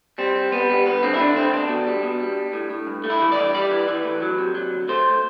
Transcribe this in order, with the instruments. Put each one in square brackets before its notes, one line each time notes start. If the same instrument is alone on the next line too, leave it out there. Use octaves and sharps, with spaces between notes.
[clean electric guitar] G3 C4
G3
G3 B3
G3
G2 B3
D3 C4
E4
D3 D4
A3 C4
E2 D4
B2
G3
B2
G3
G3
A2
A2
G2
A3
E4
E3
D5
G2
G3 D5
E3
E3
A2
F#3
C3
F#3
D2
A3 C5